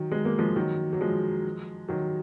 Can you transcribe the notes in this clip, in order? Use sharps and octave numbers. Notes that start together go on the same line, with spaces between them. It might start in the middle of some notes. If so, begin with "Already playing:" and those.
Already playing: D#3 F#3
G#3
A#3
F3 G#3
D#3 F#3
F#3
F3 G#3
D#3 F#3